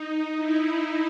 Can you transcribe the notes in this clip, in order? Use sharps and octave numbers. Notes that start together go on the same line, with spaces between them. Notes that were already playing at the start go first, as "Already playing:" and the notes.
Already playing: D#4
E4
D#4